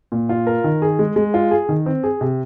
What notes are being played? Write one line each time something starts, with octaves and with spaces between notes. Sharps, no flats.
A#2
F4
A#4
D#3
G#4
G#3
G#3
F4
G#4
D#3
C4
G#4
C3